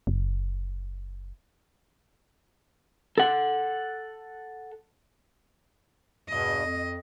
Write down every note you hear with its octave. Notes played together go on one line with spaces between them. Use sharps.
F#1
A4 F#5
E2 G2 B2 D#5
F2